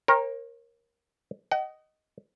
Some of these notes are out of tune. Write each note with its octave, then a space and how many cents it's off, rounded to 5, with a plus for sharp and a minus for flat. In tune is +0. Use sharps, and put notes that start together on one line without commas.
A#4 +10 C#5 -40 G5 +25
D#5 +0 F#5 +40